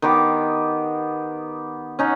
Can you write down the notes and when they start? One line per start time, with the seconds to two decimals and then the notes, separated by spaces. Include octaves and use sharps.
0.02 D#3 B3 G4 D6
1.99 C#4 D#4 F#5